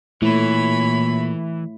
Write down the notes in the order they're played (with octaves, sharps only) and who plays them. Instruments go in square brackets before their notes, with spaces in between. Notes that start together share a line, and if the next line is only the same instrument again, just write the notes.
[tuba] A#2 [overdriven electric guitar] E3 [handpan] A3 E4 [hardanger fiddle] C#5 B5